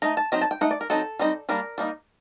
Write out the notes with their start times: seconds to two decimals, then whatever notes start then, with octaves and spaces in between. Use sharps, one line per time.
0.02 A3 D#4 A#5
0.17 A5
0.32 F#3 C4 D#4 A#5
0.42 A5
0.51 G5
0.61 A3 D#4 F#5
0.71 D5
0.81 A#4
0.90 F#3 C4 D#4 A4
1.19 G3 C4 D#4
1.49 G3 A#3 D4 A#4
1.78 G3 A#3 D#4